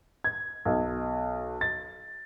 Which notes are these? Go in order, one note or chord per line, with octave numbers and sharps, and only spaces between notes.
G#6
B1
A6